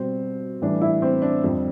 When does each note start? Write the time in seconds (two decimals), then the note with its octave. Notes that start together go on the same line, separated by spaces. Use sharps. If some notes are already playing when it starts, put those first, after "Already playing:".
Already playing: B2 G3 C4
0.62 A2 E3 G3 D4
0.81 E4
1.02 C4
1.22 D4
1.42 F2 D3 G3